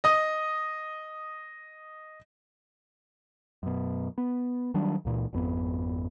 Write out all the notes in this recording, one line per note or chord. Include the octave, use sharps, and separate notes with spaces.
D#5 D#6
F#2 B2
B3
D#3 F#3 G3 D4
C#2 A#2 E3
G#1 F2 B3